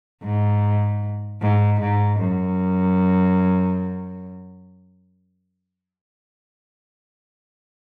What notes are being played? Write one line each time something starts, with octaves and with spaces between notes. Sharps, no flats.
G#2
G#2
G#2
F#2